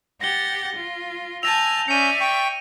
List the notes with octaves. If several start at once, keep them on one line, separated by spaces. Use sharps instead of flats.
G4 F#5 A6 A#6 G7
F4
G#5 A5 E6 G6 A#6 F7
C#4 D5 E5 G6 C#7 D#7
G5 C#6